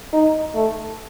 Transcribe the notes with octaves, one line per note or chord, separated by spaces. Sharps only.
D#4
A3